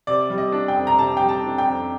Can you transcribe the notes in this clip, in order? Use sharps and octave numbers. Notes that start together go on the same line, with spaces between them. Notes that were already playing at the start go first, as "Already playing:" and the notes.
C3 D5
G3
D#5
D4
G5
F2
A#5
C3 A5
G3 G5
A5
D4
G5
F2